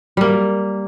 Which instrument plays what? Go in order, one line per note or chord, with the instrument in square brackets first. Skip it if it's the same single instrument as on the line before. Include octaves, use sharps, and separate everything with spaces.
[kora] G3 A#3